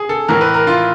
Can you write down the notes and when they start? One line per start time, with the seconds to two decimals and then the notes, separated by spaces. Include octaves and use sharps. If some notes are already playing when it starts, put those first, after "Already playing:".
Already playing: G#4
0.09 A4
0.28 A2 E3 A#4
0.41 B4
0.54 A#4
0.67 F4